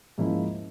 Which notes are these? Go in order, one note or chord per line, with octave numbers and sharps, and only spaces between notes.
G#2 F3 A#3 C#4 E4